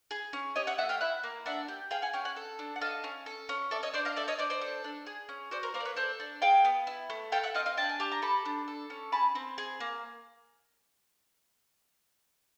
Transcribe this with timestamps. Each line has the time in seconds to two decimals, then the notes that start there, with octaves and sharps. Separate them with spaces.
0.11 G#4
0.33 C#4
0.56 G4 C#5 D#5
0.67 E5 F#5
0.78 A3 E5 F#5
0.89 F5 G5
1.01 E4 E5 F#5
1.24 A#3
1.46 D4 E5 F#5
1.68 G4
1.91 G#4 F5 G5
2.02 F#5 G#5
2.13 C#4 F5 G5
2.25 F#5 G#5
2.36 A4
2.59 D4
2.76 F#5
2.81 A4 D#5 F5
3.04 C#4
3.26 A4
3.49 C#4
3.71 A4 D5 E5
3.83 C#5 D#5
3.93 D4 C5 D5
4.05 D#5 F5
4.16 A4 D5 E5
4.28 C#5 D#5
4.39 D4 C5 D5
4.50 C5 D5
4.61 A4
4.84 D4
5.06 G#4
5.29 C#4
5.51 F#4 C5 D5
5.63 A#4 C5
5.74 A#3 A#4 C5
5.80 D5
5.85 B4 C#5
5.96 A4 C5 D5
6.20 D4
6.42 G#4 F5 G5
6.65 B3
6.87 E4
7.10 A3
7.32 A4 F5 G5
7.43 E5 F#5
7.55 C4 D#5 F5
7.66 D#5 F5
7.77 D4 G5 A5
7.89 G#5
8.00 G4 A5
8.12 A#5
8.22 A4 A5 B5
8.45 D4
8.68 A4
8.90 C#4
9.12 G#4 A5 B5
9.35 C4
9.58 G#4
9.80 A#3